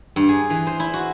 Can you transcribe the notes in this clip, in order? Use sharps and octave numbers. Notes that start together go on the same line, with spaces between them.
G2
G#4
E3
C5
E4
F#4